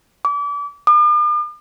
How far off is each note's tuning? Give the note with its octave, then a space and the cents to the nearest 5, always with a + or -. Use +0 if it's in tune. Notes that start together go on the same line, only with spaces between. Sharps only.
D6 -35
D6 +45